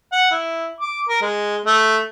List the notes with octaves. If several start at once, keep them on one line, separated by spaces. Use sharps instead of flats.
F#5
E4
D6
A#4
G#3
A3